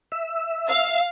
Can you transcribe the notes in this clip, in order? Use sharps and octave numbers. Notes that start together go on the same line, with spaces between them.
E5
F5